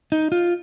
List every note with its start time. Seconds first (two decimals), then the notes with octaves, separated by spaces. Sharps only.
0.12 D#4
0.32 F4